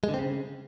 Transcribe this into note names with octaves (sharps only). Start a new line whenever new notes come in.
G#3
D3
C4
C#3